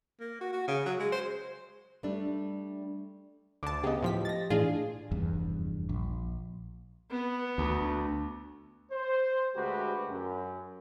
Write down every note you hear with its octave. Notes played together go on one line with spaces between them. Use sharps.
A#3
F#4
F#4
C#3
F#3
G#3
C5
G3 A3 D4
D2 A5 D6
C#3 B3 G4 D#5
A2 F3 B6
A6 A#6
A2 E3 D4 F4 G#4
F1 E2 G2
A#1
B3
D2
C5
D2 G#3 F#4 G4 B4
F#2